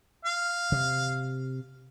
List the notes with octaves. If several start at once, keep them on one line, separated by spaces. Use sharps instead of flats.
F5
C3